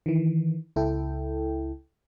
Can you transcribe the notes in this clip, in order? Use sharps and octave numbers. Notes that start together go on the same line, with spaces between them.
D#3 E3
C#2 E4 A4 G5